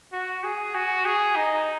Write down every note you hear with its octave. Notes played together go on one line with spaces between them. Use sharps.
F#4
G#4
F#4
G#4
D#4